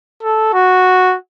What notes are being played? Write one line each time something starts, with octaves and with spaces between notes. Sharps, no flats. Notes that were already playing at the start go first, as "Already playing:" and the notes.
A4
F#4